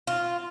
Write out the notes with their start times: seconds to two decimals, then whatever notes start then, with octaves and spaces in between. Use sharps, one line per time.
0.07 F4